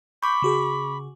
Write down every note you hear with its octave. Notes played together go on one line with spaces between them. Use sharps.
B5 C#6 D6 G6
C#3 F#4 G#4